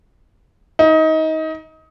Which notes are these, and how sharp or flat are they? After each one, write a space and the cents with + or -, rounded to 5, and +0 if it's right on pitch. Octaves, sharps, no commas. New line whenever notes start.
D#4 +25